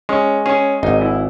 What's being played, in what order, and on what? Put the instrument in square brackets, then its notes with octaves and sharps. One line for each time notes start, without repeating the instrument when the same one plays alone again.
[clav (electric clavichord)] G#3 [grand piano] C#4
[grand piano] C#4 [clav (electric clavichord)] G#4
[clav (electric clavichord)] G#1 [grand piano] D#4
[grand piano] E4